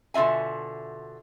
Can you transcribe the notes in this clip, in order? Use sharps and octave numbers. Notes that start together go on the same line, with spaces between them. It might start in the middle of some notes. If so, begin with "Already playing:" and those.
B2 D3 F4 E5 G#5